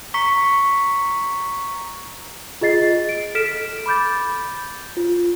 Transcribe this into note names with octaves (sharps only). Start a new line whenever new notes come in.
A#5 C#6 B6 C#7
F4 G#4 D#5 A6 C7
D7
A4 F6 B6 D7 E7
B5 D6 G6 A6
F4